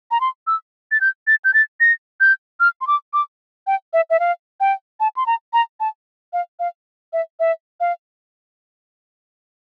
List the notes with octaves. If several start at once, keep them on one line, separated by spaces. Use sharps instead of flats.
A#5
C6
E6
A6
G6
A6
G6
A6
A#6
G6
F6
C6
D6
D6
G5
E5
E5
F5
G5
A5
C6
A#5
A#5
A5
F5
F5
E5
E5
F5